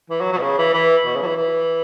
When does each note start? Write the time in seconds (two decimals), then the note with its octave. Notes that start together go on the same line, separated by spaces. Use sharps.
0.10 E3
0.21 F#3
0.32 F#3
0.37 B2
0.42 C#3
0.58 E3
0.74 E3
1.06 B2
1.16 C#3
1.21 F#3
1.26 E3
1.37 E3